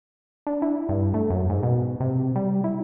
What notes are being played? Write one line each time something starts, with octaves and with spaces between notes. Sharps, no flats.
D4
E4
G2
A3
F#2
G#2
B2
C3
G3
E4